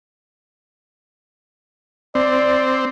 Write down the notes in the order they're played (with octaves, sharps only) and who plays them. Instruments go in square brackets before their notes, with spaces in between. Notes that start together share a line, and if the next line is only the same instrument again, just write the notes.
[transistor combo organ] C4 [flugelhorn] D5